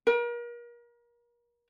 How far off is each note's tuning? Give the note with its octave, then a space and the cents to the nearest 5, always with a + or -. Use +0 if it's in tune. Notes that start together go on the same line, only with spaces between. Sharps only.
A#4 +35